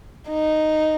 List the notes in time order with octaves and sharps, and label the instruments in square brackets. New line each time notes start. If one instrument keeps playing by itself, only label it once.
[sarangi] D#4